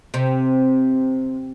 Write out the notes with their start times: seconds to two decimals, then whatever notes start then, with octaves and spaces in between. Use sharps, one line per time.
0.14 C3